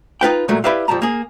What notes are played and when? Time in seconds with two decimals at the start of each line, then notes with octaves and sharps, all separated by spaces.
0.21 D#4 F4 B4 G5
0.48 A#2 F#3 G#3 A3
0.64 E4 G4 B4 D5 E5 F5
0.88 F2 F3 G3 A5 A#5
1.02 A#3 G#4